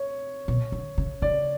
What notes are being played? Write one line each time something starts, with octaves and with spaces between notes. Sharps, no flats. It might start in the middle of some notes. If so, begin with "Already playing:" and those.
Already playing: C#5
B2
D3
C#3
C#3 D5